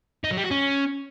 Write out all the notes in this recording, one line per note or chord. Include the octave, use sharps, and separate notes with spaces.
D#4
F#3
G3
F#4
C#4